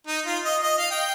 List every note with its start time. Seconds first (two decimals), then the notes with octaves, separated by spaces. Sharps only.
0.07 D#4
0.26 F4
0.44 D#5
0.63 D#5
0.78 F5
0.91 D#5 G5